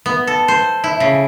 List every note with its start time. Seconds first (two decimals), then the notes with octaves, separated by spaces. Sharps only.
0.06 B3
0.27 A4
0.48 C5
0.84 E4
1.00 C#3